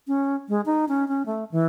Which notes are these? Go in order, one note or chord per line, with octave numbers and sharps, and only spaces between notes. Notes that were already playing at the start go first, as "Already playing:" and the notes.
C#4
G#3
D#4
C#4
C#4
A3
E3